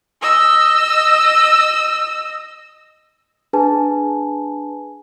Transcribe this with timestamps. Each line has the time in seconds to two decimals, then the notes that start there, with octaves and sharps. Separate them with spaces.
0.22 D#5 E6
3.53 D4 G#4 B4 G#5 A5